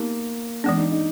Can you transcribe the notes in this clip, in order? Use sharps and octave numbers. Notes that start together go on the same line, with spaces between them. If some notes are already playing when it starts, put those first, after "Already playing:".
Already playing: A#3 B3 D#4 G4
E3 G#3 B3 D4
D#4
D#4